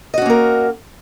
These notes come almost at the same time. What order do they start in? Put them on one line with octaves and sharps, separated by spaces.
D#5 F#4 C#4 A#3 A#4